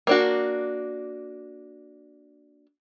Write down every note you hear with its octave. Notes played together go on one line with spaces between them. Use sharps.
A#3 D4 F#4